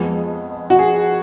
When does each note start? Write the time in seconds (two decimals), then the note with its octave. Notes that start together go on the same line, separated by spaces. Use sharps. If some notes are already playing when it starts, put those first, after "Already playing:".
Already playing: F2 F3 G#3 B3
0.70 F#4
0.79 G#4